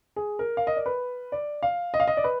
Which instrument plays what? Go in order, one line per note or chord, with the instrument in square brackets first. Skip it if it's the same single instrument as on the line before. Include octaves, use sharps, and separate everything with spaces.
[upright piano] G#4
A#4
F5
D#5
D5
B4
D5
F5
D#5
F5
D#5
D5
B4